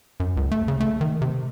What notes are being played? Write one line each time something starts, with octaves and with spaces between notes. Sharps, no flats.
F#2
C#2
A3
C#3
A3
D#3
C3